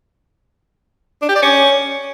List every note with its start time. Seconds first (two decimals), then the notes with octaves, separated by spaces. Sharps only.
1.22 D4
1.29 G4
1.35 D5
1.42 C#4